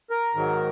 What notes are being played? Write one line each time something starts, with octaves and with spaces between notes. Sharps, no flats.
A#4
G#2 D#3 F#3